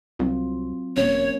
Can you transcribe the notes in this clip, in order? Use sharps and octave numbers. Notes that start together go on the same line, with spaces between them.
C2 F#3 C4 F4
E1 A#3 C#4 C#5